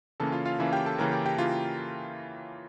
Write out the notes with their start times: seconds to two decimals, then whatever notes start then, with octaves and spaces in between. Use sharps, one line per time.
0.20 C#3 E3 A#3 C#4 A4 A5
0.32 F4 F5
0.45 F4 F5
0.59 C#3 E3 A#3 C#4 E4 E5
0.73 G4 G5
0.86 A4 A5
0.98 C#3 E3 A#3 C#4 A#4 A#5
1.12 G4 G5
1.26 G4 G5
1.38 C#3 E3 A#3 F4